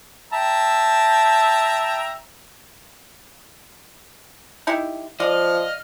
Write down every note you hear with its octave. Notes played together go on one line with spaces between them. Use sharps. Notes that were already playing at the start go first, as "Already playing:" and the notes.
E5 G5 A5 A#5
D#4 E4 G4
F3 D5 D#5 F5 F6